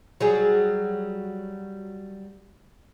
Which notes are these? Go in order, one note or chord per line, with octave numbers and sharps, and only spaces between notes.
F#3 G3 G#4